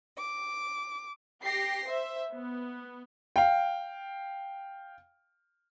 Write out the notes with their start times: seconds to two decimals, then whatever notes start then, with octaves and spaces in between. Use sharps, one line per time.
0.18 D6
1.43 G4 G5 A#6 C7
1.85 C5 E5
2.36 B3
3.36 F5 G5